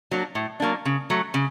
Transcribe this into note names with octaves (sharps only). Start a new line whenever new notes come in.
F#3 A#3 D4
A2
F#3 A#3 D4
C#3
F#3 A3
C#3